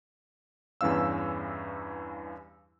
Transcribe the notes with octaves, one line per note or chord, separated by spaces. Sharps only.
E2 G2 E3 C#4 F5 E6